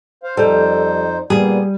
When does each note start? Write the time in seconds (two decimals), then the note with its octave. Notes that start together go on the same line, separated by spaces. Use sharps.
0.23 C5 F5
0.37 F2 G3 D#4 A4 C5
1.30 A#2 G3 A#3 B3 G#4